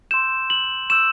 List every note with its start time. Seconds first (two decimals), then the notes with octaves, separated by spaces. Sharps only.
0.11 C6 E6 G6 E7
0.50 F#7
0.90 C#6 E6 G6 E7